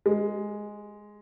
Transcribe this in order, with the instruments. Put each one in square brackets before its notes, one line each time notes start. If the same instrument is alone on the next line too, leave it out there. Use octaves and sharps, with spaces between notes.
[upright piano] G#3